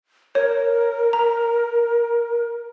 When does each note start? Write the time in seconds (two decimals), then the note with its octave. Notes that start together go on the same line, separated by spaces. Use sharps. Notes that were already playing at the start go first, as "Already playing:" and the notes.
0.35 A#4 C#5
1.13 A#5